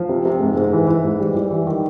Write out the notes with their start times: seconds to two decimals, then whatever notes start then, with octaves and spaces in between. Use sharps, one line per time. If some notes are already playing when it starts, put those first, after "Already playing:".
Already playing: F3
0.09 C3
0.25 C3
0.40 G#2
0.57 G#2
0.73 E3
0.87 E3
1.04 G#2
1.20 G3
1.36 G3
1.51 E3
1.67 D#3